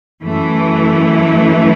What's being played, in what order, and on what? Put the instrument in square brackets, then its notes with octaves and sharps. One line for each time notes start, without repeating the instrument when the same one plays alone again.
[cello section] F#2 E3 A3